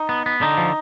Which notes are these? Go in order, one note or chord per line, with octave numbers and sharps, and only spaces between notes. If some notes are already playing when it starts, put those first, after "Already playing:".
Already playing: D#4
B3
B3
D3 D#4
F3